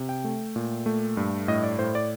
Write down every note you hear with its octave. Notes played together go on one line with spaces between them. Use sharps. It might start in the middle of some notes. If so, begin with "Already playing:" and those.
Already playing: C3
G5
A3
A#2
A3
G2
A2 D#5
D5
A2 C5
D5